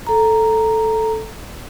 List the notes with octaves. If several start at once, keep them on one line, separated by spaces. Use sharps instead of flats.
A4 A#5